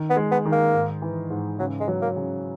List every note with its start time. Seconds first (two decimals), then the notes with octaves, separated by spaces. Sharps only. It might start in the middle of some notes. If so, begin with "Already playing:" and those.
Already playing: D#3
0.10 B3
0.16 G#3
0.31 B3
0.45 D#3
0.52 A#3
0.74 G#2
1.02 E3
1.30 G#2
1.59 C#3 F#3
1.80 G#3
1.88 F#3
2.02 A#3
2.16 C#3